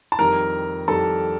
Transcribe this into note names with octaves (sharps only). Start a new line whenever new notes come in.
A5
F2 D#3 G3 A#4 A#5
F2 D#3 G3 A4 A5